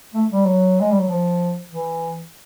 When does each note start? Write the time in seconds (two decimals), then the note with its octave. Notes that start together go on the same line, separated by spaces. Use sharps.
0.14 A3
0.31 G3
0.45 F#3
0.81 G#3
0.91 G3
0.99 F#3
1.09 F3
1.72 E3